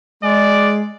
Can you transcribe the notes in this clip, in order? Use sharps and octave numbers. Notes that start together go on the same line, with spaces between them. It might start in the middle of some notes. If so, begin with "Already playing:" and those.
G#3 D5